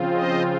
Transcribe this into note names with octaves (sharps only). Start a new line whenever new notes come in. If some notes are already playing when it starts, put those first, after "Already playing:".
Already playing: C#3 F3 C4 F4
C5 D#5